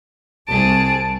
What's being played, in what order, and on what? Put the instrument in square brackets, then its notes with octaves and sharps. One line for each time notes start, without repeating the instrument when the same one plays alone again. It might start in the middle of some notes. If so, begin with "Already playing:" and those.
[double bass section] C2 [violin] G#4 A5 [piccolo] D7